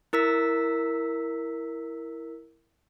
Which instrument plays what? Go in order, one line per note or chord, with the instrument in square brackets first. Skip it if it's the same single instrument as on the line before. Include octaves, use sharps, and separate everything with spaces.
[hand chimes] E4 A#4 E6 B6